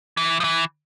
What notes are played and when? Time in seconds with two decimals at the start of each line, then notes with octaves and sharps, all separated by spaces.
0.17 E3
0.40 F3
0.44 E3